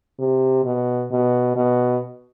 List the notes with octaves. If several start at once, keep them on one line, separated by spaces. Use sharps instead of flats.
C3
B2
B2
B2